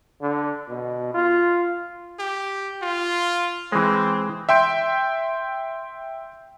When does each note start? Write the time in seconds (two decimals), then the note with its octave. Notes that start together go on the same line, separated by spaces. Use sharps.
0.22 D3
0.68 B2
1.14 F4
2.19 G4
2.82 F4
3.72 E3 G#3 C4
4.49 E5 G5 C6 G6 D7